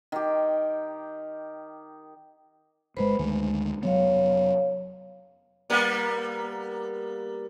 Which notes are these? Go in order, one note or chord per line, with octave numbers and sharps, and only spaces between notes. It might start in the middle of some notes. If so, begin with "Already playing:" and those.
D#3 G4
G1 B2 G#3 B4 C5 B5
D2 D#3 G#3 A3
F1 F#3 B3 C#5 F5
G3 A#3 B3